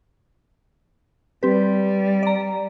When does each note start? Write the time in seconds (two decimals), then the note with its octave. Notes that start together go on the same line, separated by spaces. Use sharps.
1.43 G3 C4 G4 B4
2.23 D5 A#5